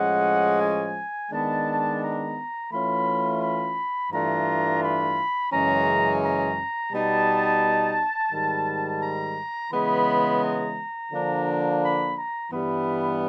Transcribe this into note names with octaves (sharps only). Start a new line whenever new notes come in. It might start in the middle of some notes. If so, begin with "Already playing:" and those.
Already playing: A2 F3 G#3 C#4 F#5
G#5
D#3 G#3 B3 D4 A5
A#5
E3 A3 C#4 F4 B5
B5
G2 E3 A3 D4 F4 A#5
B5
F#2 C#3 E3 G#3 C#4 A#5
A#5
B2 G3 B3 D#4 A5
G#2 D#3 G3
A#5
C#3 E3 G#3 B3 B5
A#5
D3 F3 A#3 D4
B5
A#5
G2 E3 G3 B3 B5